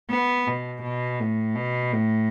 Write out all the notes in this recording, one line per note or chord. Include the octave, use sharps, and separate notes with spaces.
B3
B2
B2
A2
B2
A2